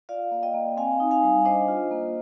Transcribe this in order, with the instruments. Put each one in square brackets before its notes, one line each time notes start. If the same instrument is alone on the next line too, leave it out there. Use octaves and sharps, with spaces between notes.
[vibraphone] F4 D5 F5
A#3
D#5 G5
A#3
C4 F5 G#5
D#4
F5 G#5
G3
D4 C5 D#5
F4
A#3